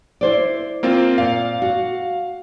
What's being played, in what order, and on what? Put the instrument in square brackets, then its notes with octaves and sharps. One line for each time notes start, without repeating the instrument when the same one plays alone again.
[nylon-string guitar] E4 C5 D5
[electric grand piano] A#3 C4 F4
[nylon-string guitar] A#2 [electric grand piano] F5
[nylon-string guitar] F#4